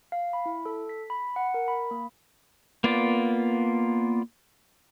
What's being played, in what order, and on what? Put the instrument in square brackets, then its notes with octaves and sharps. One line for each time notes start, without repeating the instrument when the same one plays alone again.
[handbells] F5
B5
E4
A4
B6
B5
F#5
A#4
B5
A#3
[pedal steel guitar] A#3 B3 F4 D5